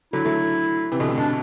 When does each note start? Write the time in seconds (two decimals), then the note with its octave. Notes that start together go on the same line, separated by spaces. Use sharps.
0.13 D3 F#3 E4
0.25 F#3 A3
0.92 C3 E3
1.00 B2 D3
1.08 A2 C3
1.17 B2 D4